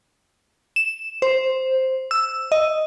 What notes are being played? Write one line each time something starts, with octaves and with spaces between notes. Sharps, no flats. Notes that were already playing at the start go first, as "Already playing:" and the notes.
E7
C5
E6
D#5